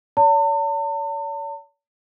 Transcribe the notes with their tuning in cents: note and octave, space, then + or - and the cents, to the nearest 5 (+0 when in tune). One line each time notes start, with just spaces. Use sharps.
C#5 +45 A5 +45